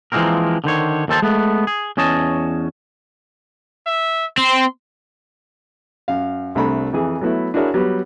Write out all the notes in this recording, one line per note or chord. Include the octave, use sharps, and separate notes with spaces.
E3 F3 G#3 A#3 C4 A#4
D3 D#3 C5 C#5
D#2 D#3 A4 C5 A5
G#3 A3 B3
G#4
E2 C#4 C#5 D#5 A5
E5
C4 C6
F#2 F5
C2 A3 C4 D4 A#5 B5
F2 E3 G#4
F#3 A3 B3 E4
D4 E4 F#4 G#4 A#4 C#5
F#3 G3 B3 G4